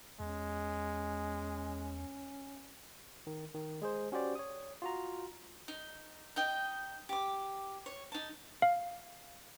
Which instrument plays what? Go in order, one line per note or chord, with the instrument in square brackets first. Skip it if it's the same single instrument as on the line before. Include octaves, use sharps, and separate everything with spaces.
[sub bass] E2 [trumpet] G#3 [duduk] C#4
[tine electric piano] D#3
D#3
G#3 G#4 C5
C#4 F#4 G4 C5 D5
C#5 D#6
F4 F#4 A#5
[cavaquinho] D#4
D#4 D#5 G5
G4 D6
C#5
D#4 A5
[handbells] F5